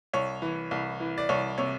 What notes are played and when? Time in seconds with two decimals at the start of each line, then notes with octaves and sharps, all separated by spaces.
0.13 C2 C#5
0.42 E3
0.71 C2
1.00 E3
1.18 D5
1.29 C2 C#5
1.58 C3 C#5